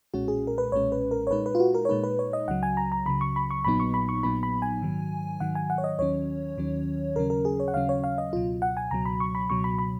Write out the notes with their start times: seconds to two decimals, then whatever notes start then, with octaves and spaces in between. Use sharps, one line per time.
0.13 B1 A#2 G#3 C#4 F#4
0.28 G#4
0.47 A#4
0.58 B4
0.72 B1 A#2 G#3 C#4 C#5
0.92 B4
1.11 A#4
1.27 C#5
1.31 A#2 G#3 D#4 B4
1.46 B4
1.55 F4
1.60 F#4
1.74 A#4
1.85 C#5
1.89 A#2 G#3 D#4 B4
2.04 B4
2.19 C#5
2.33 D#5
2.48 C#2 C#3 F#3 F#5
2.63 G#5
2.77 A#5
2.92 A#5
3.06 C#2 C#3 F#3 B5
3.21 C#6
3.36 B5
3.51 C#6
3.64 A#1 A#2 F#3 B3 D#4 B5
3.80 C#6
3.94 B5
4.09 C#6
4.23 A#1 A#2 F#3 B3 D#4 B5
4.43 B5
4.62 G#5
4.82 G#2 D#3 F#3
5.40 G#2 D#3 F#3 F#5
5.55 G#5
5.70 F#5
5.78 C#5
5.84 D#5
5.98 D#2 D#3 F#3 C#4 C#5
6.57 D#2 D#3 F#3 C#4
7.16 D#2 C#3 F#3 C#4 A#4
7.30 A#4
7.45 G#4
7.60 C#5
7.68 F#5
7.74 D#2 C#3 F#3 C#4 F5
7.89 C#5
8.04 F5
8.18 D#5
8.33 C#2 B2 F#3 F4
8.62 F#5
8.77 G#5
8.91 C#2 B2 F#3 A#5
9.05 B5
9.20 C#6
9.35 B5
9.50 C#2 B2 F#3 C#6
9.64 B5
9.79 B5